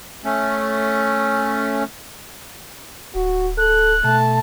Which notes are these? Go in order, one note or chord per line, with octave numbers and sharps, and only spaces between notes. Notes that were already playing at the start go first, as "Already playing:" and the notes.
A3 C#4
D1 F#4
A4 F#6
B2 A3 A5